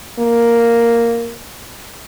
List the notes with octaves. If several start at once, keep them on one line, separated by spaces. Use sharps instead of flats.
A#3